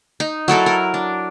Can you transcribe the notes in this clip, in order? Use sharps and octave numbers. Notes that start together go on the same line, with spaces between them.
D#4
F#3 E4 A4 A#4
A#4
D4